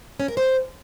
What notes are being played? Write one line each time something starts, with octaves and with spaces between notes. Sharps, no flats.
C#4
A#4
C5